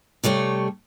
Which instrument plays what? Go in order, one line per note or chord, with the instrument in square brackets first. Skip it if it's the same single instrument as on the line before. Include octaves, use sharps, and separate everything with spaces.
[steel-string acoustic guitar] C3 G3 A3 C#5